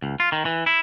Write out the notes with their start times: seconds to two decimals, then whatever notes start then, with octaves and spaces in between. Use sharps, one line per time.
0.02 C#2
0.20 F4
0.32 D#3
0.45 E3
0.66 E4